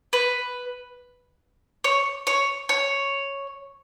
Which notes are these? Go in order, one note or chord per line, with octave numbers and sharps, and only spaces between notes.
B4
C#5
C#5
C#5